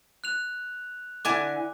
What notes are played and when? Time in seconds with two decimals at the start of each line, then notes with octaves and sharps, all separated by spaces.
0.24 F#6 F7
1.25 D3 E4 G#5 D6